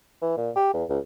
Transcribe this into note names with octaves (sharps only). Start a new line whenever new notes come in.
E3
A#2
G4
E2
C#2